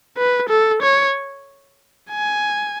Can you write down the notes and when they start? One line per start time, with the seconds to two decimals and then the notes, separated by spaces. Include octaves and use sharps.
0.18 B4
0.49 A4
0.82 C#5
2.11 G#5